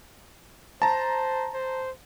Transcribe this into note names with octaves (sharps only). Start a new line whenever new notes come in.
C5 A5 A#5
C5